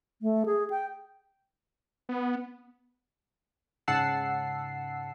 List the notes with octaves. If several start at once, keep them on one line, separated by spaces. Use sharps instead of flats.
A3
G#4
G5
B3
G#2 C#3 F#5 A5 E6 C7